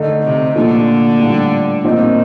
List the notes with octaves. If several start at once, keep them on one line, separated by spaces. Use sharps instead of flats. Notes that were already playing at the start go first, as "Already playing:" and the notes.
Already playing: D3 A3 D#4
C3
A#2 D3 F3 A3
A2 G3 D4 F4
A#2 D#3 F3 C4 D#4